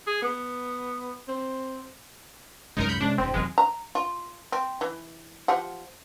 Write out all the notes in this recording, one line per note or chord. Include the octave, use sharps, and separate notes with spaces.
G#4
B3
C4
C2 F#2 G#3 D#4 A#4
B5 G6 C#7
C3 G#3 C#4 D4
E1 G2 C4
D#1 F#3 G#3 C4
A#5
F4
C4
E3
F3 G4 F#5